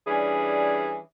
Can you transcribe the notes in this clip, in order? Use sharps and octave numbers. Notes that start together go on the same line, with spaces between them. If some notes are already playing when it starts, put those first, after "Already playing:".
E3 G3 C#4 D4 G#4